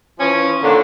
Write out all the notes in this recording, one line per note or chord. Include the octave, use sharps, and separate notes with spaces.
E3 F3 C#4
D#2 A#2 D3